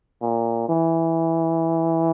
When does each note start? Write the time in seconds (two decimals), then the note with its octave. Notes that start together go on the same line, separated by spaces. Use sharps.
0.22 A#2
0.69 E3